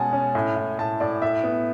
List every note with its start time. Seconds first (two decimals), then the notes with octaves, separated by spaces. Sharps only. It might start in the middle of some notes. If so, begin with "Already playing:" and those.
Already playing: B2 G#3 C#4 F#5 G#5 A5
0.13 C#4
0.35 A2
0.56 A2
0.79 A2 A5
1.00 A2 D5
1.22 A2 E5
1.44 B3